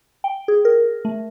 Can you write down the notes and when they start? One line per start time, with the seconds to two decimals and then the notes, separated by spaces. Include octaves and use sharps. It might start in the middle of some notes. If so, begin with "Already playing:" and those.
0.24 G5
0.48 G#4
0.65 A#4
1.05 A3